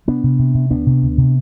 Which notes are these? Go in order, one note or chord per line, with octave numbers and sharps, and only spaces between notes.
C3 B3 D4
C3
C3
C3
D2 B3 D4
C3
D2
C3